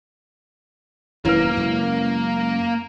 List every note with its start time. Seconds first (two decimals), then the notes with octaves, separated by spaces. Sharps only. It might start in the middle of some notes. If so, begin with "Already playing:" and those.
1.25 E1 F#2 D#3 A#3 E4 B4
1.57 F#2 C#3 G#3